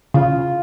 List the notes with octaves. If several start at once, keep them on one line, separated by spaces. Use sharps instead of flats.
C#3 F4